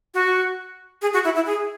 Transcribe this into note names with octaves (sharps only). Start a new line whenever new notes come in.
F#4
G#4
F#4
E4
E4
G#4